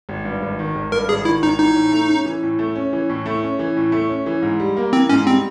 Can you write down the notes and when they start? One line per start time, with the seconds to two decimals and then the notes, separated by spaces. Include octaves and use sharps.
0.09 G#1
0.25 G2
0.42 G#1
0.59 D#3
0.75 G#1
0.92 G2 A#4
1.09 G#1 G#4
1.25 D#3 E4
1.43 G#1 D#4
1.59 E3 D#4
1.75 A2
1.92 A3
2.09 C#4
2.26 E3
2.43 A2
2.59 A3
2.75 C#4
2.93 E3
3.09 A2
3.26 A3
3.43 C#4
3.59 E3
3.77 A2
3.92 A3
4.09 C#4
4.26 E3
4.42 G#2
4.60 G3
4.77 A#3
4.93 E3 C4
5.09 G#2 C#4
5.26 G3 C4